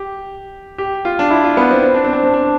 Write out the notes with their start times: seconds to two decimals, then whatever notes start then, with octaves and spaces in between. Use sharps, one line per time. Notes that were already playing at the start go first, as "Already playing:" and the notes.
Already playing: G4
0.78 G4
1.05 F4
1.19 D4
1.31 E4
1.44 F4
1.57 B3
1.71 C4
1.83 C4
1.94 D4
2.04 C4
2.13 D4
2.24 C4
2.34 D4